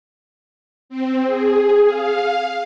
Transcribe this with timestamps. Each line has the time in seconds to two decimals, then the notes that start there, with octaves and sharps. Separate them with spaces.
0.89 C4
1.26 G#4
1.85 F5